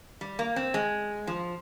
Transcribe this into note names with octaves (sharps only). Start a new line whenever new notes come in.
G3
A#3
C4
G#3
F3